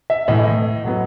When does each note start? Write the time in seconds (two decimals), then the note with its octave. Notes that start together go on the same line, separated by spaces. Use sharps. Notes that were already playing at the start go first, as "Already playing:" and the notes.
0.10 E5
0.28 A2 E3 A3 D#5
0.84 A2 F#3 B3